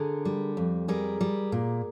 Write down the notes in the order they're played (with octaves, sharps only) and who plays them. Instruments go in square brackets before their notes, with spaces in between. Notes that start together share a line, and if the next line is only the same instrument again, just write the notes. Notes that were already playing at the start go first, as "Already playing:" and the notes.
Already playing: [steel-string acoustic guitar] D3 G#4 A#4
G3
F2
G3 G#4 A#4
G3
A#2